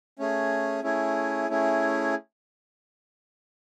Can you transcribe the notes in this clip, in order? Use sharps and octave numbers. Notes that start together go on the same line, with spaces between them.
A3 C#4 G#4
A3 C#4 E4 G#4
A3 C#4 E4 G#4